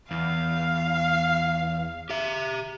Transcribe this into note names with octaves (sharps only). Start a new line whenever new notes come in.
E2 F5
G4 E5